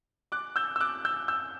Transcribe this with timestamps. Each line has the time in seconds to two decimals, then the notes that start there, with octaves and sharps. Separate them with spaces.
0.32 D6 F#6
0.56 E6 G6
0.76 E6
0.80 D6 F#6
1.05 E6 G6
1.28 E6 G6